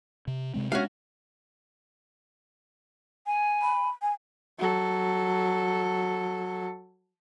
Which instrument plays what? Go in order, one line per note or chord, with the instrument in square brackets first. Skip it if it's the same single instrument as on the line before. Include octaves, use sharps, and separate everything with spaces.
[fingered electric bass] C3
C3 G#3 C4
[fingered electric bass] G#3 D4 [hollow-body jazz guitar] C#4 F#4 F5
[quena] G#5
[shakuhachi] B5
G#5
[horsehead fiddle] F#3 A4